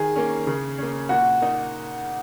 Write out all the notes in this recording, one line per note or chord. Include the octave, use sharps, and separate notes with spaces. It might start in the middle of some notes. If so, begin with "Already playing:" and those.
Already playing: D#3 G#4
A#3 C#4
C#3
A#3 C#4
A#2 F#4
A#3 D#4